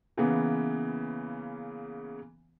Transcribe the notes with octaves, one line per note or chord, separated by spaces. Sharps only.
C#3 E3 A#3 B3